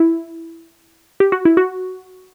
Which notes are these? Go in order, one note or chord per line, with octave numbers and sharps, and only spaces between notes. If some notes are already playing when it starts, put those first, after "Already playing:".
Already playing: E4
G4
F#4
E4
F#4